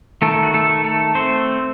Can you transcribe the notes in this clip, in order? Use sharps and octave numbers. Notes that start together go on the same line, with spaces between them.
D#3 A3 A4
F#4
A3 A4
A3
A3 A4
A3 C4 C5